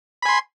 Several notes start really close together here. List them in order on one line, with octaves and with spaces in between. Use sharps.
B5 G#5 C6